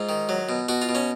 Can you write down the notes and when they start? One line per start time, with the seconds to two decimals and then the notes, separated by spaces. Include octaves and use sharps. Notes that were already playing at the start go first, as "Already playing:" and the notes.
Already playing: G#2 F4
0.09 D#3
0.29 F#3
0.49 B2
0.69 B2 F#4
0.82 F4
0.89 B2
0.95 C#4